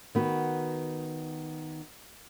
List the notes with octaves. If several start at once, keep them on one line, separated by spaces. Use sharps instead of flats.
D#3 B3 F#4